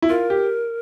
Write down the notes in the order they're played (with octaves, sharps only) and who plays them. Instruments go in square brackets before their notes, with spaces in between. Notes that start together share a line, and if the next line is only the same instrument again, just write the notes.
[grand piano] E4
[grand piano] F4 [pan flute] A#4
[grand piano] G4